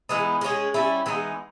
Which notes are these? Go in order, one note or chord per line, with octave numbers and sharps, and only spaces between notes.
E3 G#3 B3 D#4
G#3 C#4 G#4
G3 C#4 E4
E3 G#3 B3 D#4